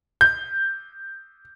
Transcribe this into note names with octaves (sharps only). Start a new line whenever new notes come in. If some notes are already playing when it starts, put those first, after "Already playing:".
G6